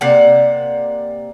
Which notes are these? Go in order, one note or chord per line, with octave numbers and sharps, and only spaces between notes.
C3 A#3 D5 F#5